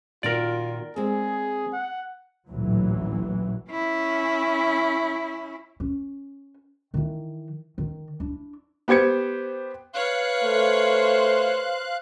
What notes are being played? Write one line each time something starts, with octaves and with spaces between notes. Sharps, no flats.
A#2 D#3 F4 F#4 A#4 D5
G#3 C4 G#4
F#5
A1 D2 A#2 E3 F#3
C#4 E4
C#4
D#3 E3
D#3
D4 E4
B3 G4 C5 G#6 C#7
B4 C#5 F5 F#6
A3 C5